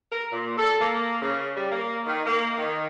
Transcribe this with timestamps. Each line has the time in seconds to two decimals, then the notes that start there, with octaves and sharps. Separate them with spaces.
0.11 A#4
0.32 A#2
0.58 A4
0.80 A#3
1.22 C#3
1.57 G3
1.72 A#3
2.06 D#3
2.26 A#3
2.57 D#3